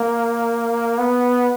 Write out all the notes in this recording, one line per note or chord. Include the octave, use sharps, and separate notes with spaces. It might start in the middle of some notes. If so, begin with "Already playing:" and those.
Already playing: A#3
B3